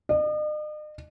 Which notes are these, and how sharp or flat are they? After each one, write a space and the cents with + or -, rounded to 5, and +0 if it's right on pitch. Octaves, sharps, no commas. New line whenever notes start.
D#5 -45